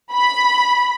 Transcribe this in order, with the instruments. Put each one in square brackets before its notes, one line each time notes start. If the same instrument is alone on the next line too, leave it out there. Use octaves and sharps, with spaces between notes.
[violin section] B5